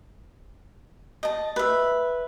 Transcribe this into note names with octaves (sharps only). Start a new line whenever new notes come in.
D#5 A5
B4 E5